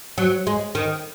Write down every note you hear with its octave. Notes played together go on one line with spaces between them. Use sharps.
F#3
G#3
D#3